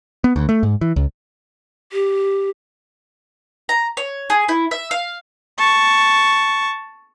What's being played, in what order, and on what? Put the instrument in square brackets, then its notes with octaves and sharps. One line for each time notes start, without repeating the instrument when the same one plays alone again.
[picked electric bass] B3
D2
A3
G#2
E3
C#2
[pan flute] G4
[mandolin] A#5
C#5
G#4
E4
E5
F5
[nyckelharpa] A5 C#6